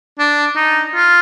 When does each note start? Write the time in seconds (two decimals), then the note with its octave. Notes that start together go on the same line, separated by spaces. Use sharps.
0.19 D4
0.56 D#4
0.95 F4